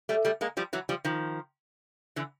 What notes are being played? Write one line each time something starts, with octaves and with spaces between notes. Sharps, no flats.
G3 A3
G3 A3
G#3 A#3
F3 G3
E3 F#3
F3 G3
D#3 F3
D3 E3